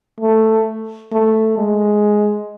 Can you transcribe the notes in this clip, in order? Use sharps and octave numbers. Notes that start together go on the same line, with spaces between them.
A3
A3
G#3